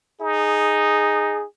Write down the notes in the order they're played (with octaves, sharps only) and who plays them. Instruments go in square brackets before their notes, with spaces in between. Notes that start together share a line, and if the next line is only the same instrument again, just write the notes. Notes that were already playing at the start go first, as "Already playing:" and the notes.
[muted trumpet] D#4 [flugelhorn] G#4